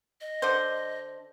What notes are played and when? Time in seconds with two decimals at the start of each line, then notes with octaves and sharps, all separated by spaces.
0.21 D#5
0.42 D3 C5